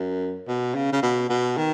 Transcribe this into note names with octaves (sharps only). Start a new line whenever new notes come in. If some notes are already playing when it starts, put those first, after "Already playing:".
Already playing: F#2
B2
C#3
C#3
B2
B2
D#3